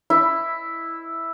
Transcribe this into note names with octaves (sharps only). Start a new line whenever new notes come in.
E4